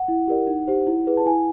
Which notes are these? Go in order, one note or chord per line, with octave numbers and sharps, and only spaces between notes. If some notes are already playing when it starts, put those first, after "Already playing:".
Already playing: F#5
E4
G4 A#4 D5
D#4
G4 C5
E4
G#4 B4
A5
E4 G#5